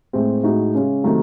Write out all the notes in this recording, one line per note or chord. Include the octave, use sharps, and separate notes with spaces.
A2 G#3 C4
A2 G#3 D#4 F#4
C#3 G#3 C#4
C3 D#3 F#3 A3